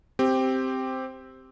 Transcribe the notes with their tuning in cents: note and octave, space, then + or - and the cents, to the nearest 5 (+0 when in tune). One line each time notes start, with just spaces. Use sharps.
C4 +0 G4 +0